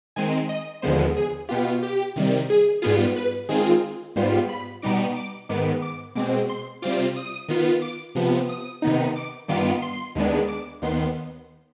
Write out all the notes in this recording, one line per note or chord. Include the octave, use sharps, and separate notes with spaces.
D#3 G#3 C4 G#5
D#5
D#2 D3 F3 G#3 B3 C5
G#4
B2 B3 F4 G4
G4
C3 D#3 G3
G#4
G#2 G3 B3 F4 G#4
B4
D#3 G#3 C4 F4 G#4
G#2 G3 B3 F4 C5
B5
B2 G3 B3 D#4 D6
D6
G#2 D#3 B3 D6
D6
B2 G#3 C4 D6
C6
C3 G3 C4 F4 D6
D#6
D#3 B3 F4
D6
C3 F3 B3
D#6
C3 D#3 B3 D#4
D6
G2 D#3 B3 F4 D6
C6
D#2 D#3 G#3 B3 D4
D6
D#2 D#3 B3 C6